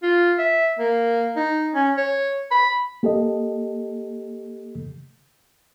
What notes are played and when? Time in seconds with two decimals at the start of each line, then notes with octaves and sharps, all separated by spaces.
0.03 F4
0.38 E5
0.79 A#3
1.37 D#4
1.75 C#4
1.97 C#5
2.51 B5
3.03 A#3 G4 A4 D#5